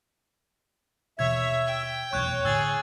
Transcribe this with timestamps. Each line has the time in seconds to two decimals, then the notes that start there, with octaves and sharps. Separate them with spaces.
1.19 D#2 B2 E3 C#5 E5 G#6
1.66 G5
2.13 F1 B1 E2 C#5 C#6 F#6 G6
2.45 A2 D3 G#4 E6 G#6 A6